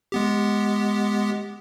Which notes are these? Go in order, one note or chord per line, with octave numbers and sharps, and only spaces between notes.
G#3 B3 G4